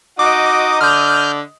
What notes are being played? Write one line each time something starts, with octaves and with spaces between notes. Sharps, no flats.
D#4 F#4 D#5 D6 D#6
D3 F6 G6